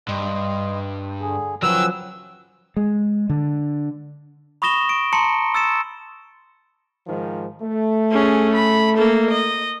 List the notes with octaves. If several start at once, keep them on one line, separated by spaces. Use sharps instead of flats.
G2 D#5 C6
D3 G#4
F3 F#3 C#4 A#4 B4 F#5 G5 E6
G#3
D3
B5 C#6 D#6 A#6 E7 G7
D7
A5 A#5 C6 C#7
E6 A6 C#7 E7
G#2 D#3 F3
A3
C#4 G#4
B5
A#3 A4
D#5